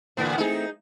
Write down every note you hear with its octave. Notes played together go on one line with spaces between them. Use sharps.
A2 D3 E3 A#3 B3
A3 C4 D#4 G#4